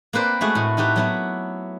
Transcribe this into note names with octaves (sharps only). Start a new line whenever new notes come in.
A#3 C4 B4 C5 D5
G#3 A3 F#4 G#4
A2 D#5
D#4 F#4 G4 A4 B4
F#3 B3 E4